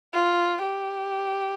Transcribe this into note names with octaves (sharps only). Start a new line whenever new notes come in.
F4
G4